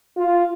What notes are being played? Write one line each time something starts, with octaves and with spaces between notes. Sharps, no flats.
F4